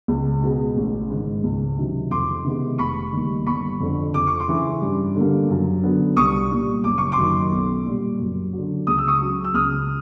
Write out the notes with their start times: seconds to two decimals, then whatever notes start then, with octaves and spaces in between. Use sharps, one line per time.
0.08 C#2
0.42 B2 G#3 B3
0.77 A1
1.10 G#2 D#3
1.44 C#2
1.77 C3 D#3 F#3
2.11 F2 C6 D6
2.44 C3 D#3 G#3 B3
2.78 F1 B5 C#6
3.13 D#2 D#3 G3
3.46 G1 B5 C#6
3.80 F2 D3
4.14 F2 D6
4.27 C#6
4.40 C6 D6
4.48 C#3 E3
4.82 G2
5.16 D3 G3 A#3
5.50 F#2
5.83 D3 F#3 B3
6.16 C2 C#6 D#6
6.51 A#2 G3
6.84 F#1 D6
6.98 C#6
7.12 C6 D6
7.18 F#2 D#3
7.52 B1
7.86 A#2 G3
8.19 F#2
8.53 F#3
8.58 D3
8.87 C#2 D#6
8.98 E6
9.07 C#6 D#6
9.21 C#3 F#3
9.44 E6
9.54 C#2 D#6 F6